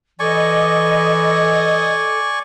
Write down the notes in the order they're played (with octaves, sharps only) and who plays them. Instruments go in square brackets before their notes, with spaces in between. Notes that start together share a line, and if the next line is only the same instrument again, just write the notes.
[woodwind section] E3 [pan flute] A4 [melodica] D5 G#5 C#6 [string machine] D#5